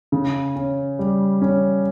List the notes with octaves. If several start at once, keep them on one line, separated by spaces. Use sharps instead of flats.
C#3
C#4
G3
C#4